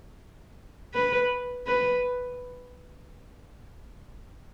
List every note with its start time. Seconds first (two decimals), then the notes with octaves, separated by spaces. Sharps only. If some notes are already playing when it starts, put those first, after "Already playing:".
0.94 B4
1.67 B4